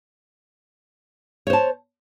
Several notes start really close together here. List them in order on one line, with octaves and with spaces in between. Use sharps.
C#5 C5 A5